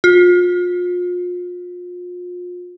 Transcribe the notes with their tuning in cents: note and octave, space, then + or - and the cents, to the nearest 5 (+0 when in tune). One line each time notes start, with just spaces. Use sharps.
F4 +35